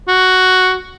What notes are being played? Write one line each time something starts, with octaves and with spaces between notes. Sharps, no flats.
F#4